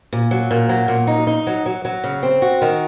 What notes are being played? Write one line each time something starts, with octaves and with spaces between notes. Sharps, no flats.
A#2
F#3
A#2
F#3
A#2
D#4
D#4
F#3
F#3
F#3
C#3
C4
F#4
D#3